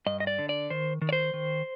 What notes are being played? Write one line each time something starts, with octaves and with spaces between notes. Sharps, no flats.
G2 D#5
D#5
D5
D3
D5
D#3 C5
D#3
D5
C5
D#3